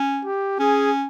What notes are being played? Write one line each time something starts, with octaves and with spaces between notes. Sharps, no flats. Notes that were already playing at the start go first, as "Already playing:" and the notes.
Already playing: C#4
G4
C#4 G#4